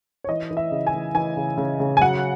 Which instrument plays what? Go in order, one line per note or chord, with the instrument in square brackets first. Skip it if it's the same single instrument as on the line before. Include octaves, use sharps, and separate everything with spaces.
[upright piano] C#5
E3 D#5
E3
E5
C#3
G#5
E3
E3 G#5
C#3
C#3
C#3
G#5
F#3 F#5